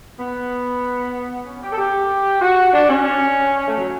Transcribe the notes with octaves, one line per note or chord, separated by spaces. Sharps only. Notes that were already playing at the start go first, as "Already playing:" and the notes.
B3
C#4
G4
A4
G4
F#4
D4
C#4
A3
F#3